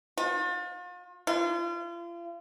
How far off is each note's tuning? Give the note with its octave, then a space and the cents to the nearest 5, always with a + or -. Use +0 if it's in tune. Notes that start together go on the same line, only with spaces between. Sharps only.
F4 +40
F4 -35